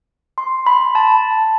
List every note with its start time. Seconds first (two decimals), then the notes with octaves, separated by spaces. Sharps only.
0.38 C6
0.66 B5
0.95 A5